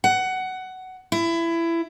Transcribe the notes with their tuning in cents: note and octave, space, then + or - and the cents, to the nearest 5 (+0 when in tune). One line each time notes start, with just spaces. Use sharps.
F#5 +15
E4 +20